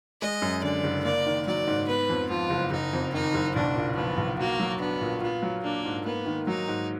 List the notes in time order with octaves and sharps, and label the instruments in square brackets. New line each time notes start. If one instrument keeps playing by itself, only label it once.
[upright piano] G#3 [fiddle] D#5
[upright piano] F#2
[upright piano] D3 [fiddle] D5
[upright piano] F#1
[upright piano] A#3 [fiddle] D5
[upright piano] D#3
[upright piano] F#3 [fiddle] D5
[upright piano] G#2
[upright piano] B3 [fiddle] B4
[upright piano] F2
[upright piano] F3 [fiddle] F4
[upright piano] F#1
[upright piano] F#1 [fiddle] D#4
[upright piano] F2
[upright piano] D#3 [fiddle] D#4
[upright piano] F#1
[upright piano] B1 [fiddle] D4
[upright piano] A#2
[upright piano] F3 [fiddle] B3
[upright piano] B1
[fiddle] A#3 [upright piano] F#4
[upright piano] F#3
[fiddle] B3 [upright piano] D4
[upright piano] A#2
[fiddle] B3 [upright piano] F4
[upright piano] F#3
[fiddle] A#3 [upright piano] D4
[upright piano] G#2
[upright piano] A#3 [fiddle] B3
[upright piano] D#3
[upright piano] F#3 [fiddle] D#4
[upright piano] G#2